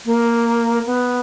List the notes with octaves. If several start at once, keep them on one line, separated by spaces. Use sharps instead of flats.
A#3
B3